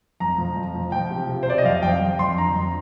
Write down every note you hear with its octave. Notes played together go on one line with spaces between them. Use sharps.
F2 A#5
F3
F2
F3
F3 G5
C3
C3
C5
C3 D5
D#5
F2 F5
F2 G5
F2
F2 C6
D3 A#5
F2